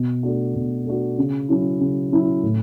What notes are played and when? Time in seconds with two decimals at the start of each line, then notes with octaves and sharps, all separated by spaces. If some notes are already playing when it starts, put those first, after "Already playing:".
Already playing: B2
0.23 A3 D4 F#4
0.55 B2
0.85 A3 D4 F#4
1.18 C#3
1.49 F#3 C#4 E4
1.80 C#3
2.11 F#3 C#4 E4
2.43 A2